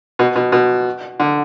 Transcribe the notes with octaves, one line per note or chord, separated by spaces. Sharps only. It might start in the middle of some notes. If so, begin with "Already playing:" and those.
B2
B2
B2
D3